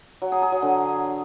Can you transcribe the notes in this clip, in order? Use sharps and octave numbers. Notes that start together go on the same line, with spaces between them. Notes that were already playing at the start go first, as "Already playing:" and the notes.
F#3
G#4
G#4
F#3
D3